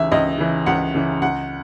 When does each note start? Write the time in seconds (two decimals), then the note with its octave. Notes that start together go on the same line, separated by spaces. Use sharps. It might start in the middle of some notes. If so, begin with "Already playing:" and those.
Already playing: C#2 C#3 E3 E5
0.12 C#2 D#5
0.38 C#3 E3
0.66 C#2 F#5
0.94 C#3 E3
1.22 C#2 F#5